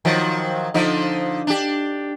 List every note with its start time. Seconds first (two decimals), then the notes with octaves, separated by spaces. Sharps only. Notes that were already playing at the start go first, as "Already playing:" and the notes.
0.05 D#3 F3 F#3
0.74 D3 F3 D#4
1.47 D4 G4